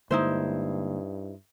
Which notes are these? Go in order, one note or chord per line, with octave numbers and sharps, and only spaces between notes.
G2 D3 G#3 A#3 D#4 E4 C5